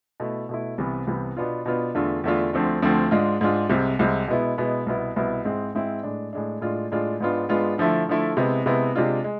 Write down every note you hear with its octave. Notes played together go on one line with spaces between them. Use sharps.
B2 A3 E4
B2 A3 E4
C2 C3 E3 B3
C2 C3 E3 B3
B2 B3 D4 F4
B2 B3 D4 F4
E2 D3 A3 D4 F4
E2 D3 A3 D4 F4
D2 D3 F3 A3 C4
D2 D3 F3 A3 C4
G#2 G#3 D4 F4
G#2 G#3 D4 F4
C2 C3 G#3
C2 C3 G#3
B2 G#3 B3 E4
B2 G#3 B3 E4
C2 B2 B3 E4
C2 B2 B3 E4
G#2 G#3 C4 E4
G#2 G#3 C4 E4
A2 G#3 D4
A2 G#3 D4
A2 G#3 D4 F4
A2 G#3 D4 F4
G#2 G#3 B3 D4 F4
G#2 G#3 B3 D4 F4
D3 F3 A3 E4
D3 F3 A3 E4
C3 G#3 B3 E4
C3 G#3 B3 E4
C3 G#3 D4 F4
G#3